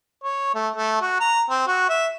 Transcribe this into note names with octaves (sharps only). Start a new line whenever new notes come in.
C#5
A3
A3
F#4
A#5
C4
F#4
E5